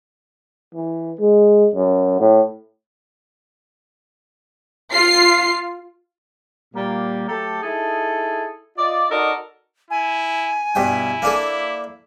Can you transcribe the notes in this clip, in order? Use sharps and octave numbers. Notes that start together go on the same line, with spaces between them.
E3
G#3
F#2
A2
F4 C7
A#2 G3 A#3
F#3 A3 G4 A4
D#4 E4 G#4 A4
F4 D5 D#5
D#4 F#4 A4 A#4 D5 D#5
E4 G#5
G2 B2 E4 G5
A#3 D4 A4